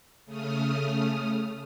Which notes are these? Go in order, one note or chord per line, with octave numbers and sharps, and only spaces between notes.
C#3 A3 D#6 F6